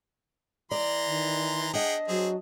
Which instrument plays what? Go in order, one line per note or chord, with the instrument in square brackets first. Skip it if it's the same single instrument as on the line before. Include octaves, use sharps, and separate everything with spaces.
[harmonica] E3 A#5 C6 [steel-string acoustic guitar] D5
[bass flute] D#3
[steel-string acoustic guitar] D4 D#5 [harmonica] G#4 F#5 G5
[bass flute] F#3 [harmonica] C4 G#4